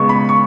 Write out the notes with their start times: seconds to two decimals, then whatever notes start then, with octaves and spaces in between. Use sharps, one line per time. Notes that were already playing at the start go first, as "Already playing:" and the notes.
Already playing: C#3 G#3 B3 C#6
0.09 B5
0.29 C#6